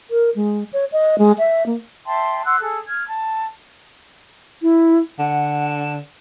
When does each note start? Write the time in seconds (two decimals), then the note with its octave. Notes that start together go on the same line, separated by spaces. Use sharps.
0.10 A#4
0.35 G#3
0.73 C#5
0.92 D#5
1.18 G#3
1.38 E5
1.66 A#3
2.05 E5 G5 A5 C6
2.44 F#5 C6 E6 F#6
2.61 G#4 A4
2.88 F6 G#6
3.07 A5
4.62 E4
5.19 D3 F#5